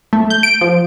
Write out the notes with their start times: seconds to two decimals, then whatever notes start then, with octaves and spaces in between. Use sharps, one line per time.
0.13 A3
0.30 G6
0.43 D7
0.61 F3